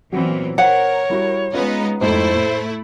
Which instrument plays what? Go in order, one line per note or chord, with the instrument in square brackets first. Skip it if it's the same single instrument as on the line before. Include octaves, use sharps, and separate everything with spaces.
[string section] A#2 E3 [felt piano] F#3 B3 C4
[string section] A#4 [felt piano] C5 [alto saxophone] C#5 [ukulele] F#5
[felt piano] G3 E4 F#4
[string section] G#3 B3 D#4 [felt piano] C#4 F4 B4
[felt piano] F2 G#2 F3 [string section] A3 E4 [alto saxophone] C5
[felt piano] A2